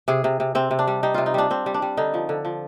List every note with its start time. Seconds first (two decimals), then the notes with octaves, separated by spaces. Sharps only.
0.08 C3 G#4
0.24 C3
0.40 C3
0.55 C3 C4
0.71 C3
0.79 D4
0.87 G3
1.03 G3 D#4
1.14 C3 F4
1.26 D#4
1.34 G3 D4
1.50 G3 C4
1.66 G3
1.74 D4
1.82 G3
1.97 D3 D#4
2.14 F3
2.29 D3
2.45 F3